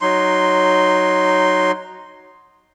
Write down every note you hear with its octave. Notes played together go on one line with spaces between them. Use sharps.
F#3 D#4 C6